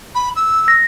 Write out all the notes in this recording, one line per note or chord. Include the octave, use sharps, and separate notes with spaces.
B5
E6
A#6